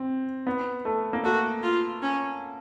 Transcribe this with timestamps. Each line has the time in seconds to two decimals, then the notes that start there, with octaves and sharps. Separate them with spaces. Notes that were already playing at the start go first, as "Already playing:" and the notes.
Already playing: C4
0.47 B3
0.85 A3
1.13 A#3
1.24 A3 F#4
1.63 F4
2.02 C#4